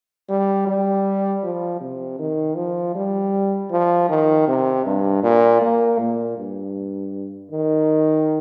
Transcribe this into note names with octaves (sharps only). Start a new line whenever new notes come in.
G3
G3
F3
C3
D#3
F3
G3
F3
D#3
C3
G2
A#2
A#3
A#2
G2
D#3